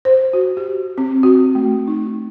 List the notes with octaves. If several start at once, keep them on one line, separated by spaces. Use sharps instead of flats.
C5
F#4
G4
C4
F#4
A3
D#4